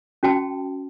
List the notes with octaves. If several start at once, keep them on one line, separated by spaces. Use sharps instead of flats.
C#4 F#4 G5 A5